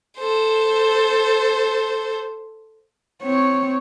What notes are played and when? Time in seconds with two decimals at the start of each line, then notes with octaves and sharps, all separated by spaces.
0.19 A4 C5
3.23 C4 C#5